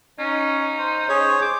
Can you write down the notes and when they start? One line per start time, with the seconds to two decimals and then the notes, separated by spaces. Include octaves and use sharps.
0.19 C#4 D#4
0.80 C5
1.09 C#4 G#4 C#5
1.42 D6